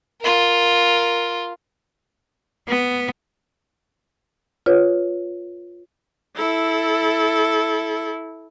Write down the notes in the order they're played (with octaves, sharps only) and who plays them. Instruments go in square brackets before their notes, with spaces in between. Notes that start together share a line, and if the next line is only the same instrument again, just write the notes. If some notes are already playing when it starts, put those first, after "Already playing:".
[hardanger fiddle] F4 A#4
[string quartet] B3
[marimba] F4 B4 C#5
[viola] E4 A4